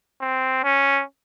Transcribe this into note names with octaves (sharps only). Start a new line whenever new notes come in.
C4
C#4